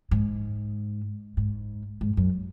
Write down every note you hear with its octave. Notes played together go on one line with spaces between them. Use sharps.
G#2
G#2
G#2
F#2